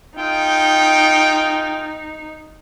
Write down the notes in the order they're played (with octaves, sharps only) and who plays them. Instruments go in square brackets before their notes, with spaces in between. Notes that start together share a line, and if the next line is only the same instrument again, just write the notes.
[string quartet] D#4 [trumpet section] F4 G#4 G5